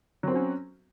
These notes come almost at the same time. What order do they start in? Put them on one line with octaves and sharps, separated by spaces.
F#3 C4 F#4 C#4